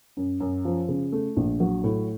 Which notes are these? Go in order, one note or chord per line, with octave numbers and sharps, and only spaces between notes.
F#2
F#2
F3
C#3
A3
A#1
F#3
A2